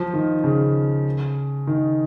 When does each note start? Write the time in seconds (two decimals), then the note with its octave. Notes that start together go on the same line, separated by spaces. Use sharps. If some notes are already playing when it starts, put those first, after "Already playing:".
Already playing: F3
0.14 D#3
0.44 C#3
1.67 D#3